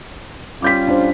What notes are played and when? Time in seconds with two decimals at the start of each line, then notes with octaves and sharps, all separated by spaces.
0.62 G3 C#4 F4 D6 G6 B6
0.88 D4 C5